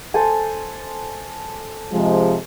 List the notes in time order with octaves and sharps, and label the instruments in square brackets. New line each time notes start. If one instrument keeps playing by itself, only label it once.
[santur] A4 C5 G#5
[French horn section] C3 F3 G#3